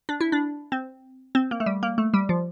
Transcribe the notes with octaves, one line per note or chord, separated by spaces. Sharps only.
D4
E4
D4
C4
C4
A#3
A3
G3
A#3
A3
G3
F3